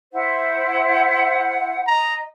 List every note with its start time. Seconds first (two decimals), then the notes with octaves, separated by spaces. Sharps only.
0.13 E4 C5 F#5
1.87 D#5 A#5